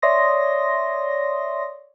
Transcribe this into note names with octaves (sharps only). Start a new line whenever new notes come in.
C#5 D5 E5 C6 D#6 A#6